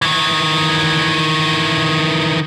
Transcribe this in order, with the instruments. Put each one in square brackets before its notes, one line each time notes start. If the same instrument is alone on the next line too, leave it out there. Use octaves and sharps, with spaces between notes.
[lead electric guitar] D#3 E3